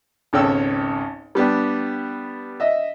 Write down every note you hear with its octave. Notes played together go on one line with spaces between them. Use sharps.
G#1 C#2 A4 C#5 G5 E6
G3 B3 D4 G4
D#5 E5